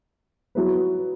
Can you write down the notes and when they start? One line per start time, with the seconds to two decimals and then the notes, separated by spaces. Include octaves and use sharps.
0.55 F#3 B3 E4 B4